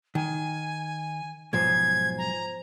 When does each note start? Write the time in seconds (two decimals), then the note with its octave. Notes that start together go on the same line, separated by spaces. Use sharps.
0.15 D#3 G#5
1.53 B1 G#2 F3 C5 G#5 G#6
2.18 A#5